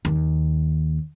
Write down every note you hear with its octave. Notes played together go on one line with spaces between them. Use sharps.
D#2